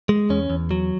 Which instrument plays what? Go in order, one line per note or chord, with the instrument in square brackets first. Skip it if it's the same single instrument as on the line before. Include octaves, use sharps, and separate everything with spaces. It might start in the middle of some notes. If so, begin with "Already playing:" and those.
[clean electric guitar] G#3
E2 C#4
E2
F#3